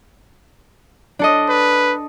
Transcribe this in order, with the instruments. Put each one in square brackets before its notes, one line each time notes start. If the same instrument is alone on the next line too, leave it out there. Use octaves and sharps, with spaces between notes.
[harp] D4 A4 D#5
[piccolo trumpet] B4